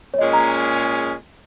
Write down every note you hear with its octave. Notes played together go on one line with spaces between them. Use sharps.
C#5
A#2 G#3 C#4 G#4 D#5
A#5